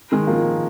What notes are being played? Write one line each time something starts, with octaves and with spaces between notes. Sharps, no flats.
D#3 G#3
F3 A#3